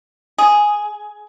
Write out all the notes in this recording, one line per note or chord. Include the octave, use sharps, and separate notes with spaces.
G#4